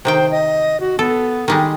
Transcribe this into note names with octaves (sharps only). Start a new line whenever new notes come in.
C3 D#3 C5 G5
D#5
F#4
B3 A4
D#3 G3 G#3